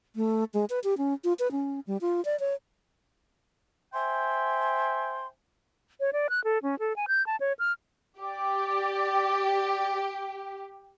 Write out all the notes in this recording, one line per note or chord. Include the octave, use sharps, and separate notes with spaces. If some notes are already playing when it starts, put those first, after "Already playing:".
A3
G#3
B4
G4
C#4
F4
B4
C#4
G3
F4
D5
C#5
C5 E5 G5 G#5 C6
C#5
D5
F#6
A4
C#4
A4
G#5
G6
A5
C#5
F6
G4 D5 D6